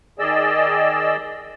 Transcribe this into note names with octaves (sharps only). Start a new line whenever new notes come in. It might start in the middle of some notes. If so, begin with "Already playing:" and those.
D#3 G#4 D5 D#5 E6